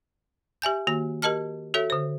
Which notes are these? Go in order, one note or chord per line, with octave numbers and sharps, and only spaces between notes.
G4 E5 G#5 G6
D#3 A#3 F#4
G4 A#4 D#5 A5 F6
F#4 A4 C#5 E5
D3 C5